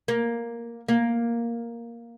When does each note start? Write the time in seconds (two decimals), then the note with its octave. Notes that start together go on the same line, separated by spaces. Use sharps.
0.08 A#3
0.88 A#3